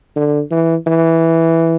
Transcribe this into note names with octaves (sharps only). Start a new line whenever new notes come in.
D3
E3
E3